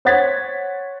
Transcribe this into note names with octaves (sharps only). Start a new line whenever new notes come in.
C5 C#5 F#5 G#6 A6 B6